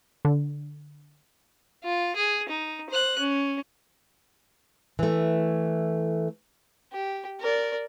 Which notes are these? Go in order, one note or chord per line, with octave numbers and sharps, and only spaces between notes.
D3
F4
G#4
D#4
C5 F#6
C#4
E3 A3
G4
A#4 D5